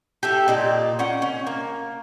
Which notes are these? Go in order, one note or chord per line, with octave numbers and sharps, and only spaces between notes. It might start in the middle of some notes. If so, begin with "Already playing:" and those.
G4 A4 E5
A#2 D#4 D5
C#4 F#5 G5
C#4
A#3